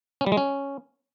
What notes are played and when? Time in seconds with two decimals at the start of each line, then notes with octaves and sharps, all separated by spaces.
0.21 C#4
0.26 G3
0.32 G#3
0.37 C#4